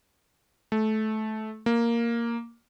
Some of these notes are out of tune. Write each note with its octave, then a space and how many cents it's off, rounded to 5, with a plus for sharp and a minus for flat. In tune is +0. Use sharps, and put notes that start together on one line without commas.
A3 -20
A#3 +0